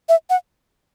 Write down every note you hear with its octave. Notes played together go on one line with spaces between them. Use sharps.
E5
F#5